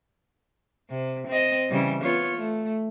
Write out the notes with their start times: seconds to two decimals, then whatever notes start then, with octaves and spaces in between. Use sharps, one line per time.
0.90 C3
1.28 C4 D#5
1.70 C#3 E3 G3
2.03 B3 F4 C#5
2.37 A3